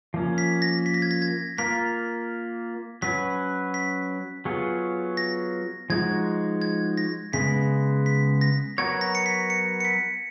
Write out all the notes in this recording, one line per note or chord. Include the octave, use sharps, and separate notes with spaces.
F3 A#3 C#4
B6
A#6
B6
A#6
G#6
A#6
G#6
A#3 F4 A#4 B6
F#3 C#4 F#4 B4 B6
B6
F#3 B3 F4 G#4 C#5
A#6
F3 G#3 D#4 F#4 G#6
G#6
A#6
C#3 G#3 B3 B6
B6
A#6
F#3 B3 F#4 A#4 C#5 G#6
A#6
C#7
B6
C#7
C#7
B6